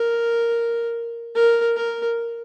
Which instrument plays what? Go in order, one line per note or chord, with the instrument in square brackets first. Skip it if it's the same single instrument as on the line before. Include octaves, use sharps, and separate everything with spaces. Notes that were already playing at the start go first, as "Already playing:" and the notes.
Already playing: [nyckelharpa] A#4
A#4
A#4